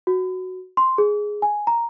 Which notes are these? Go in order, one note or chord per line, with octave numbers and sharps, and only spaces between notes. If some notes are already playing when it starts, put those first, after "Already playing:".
F#4
C6
G#4
G#5
A#5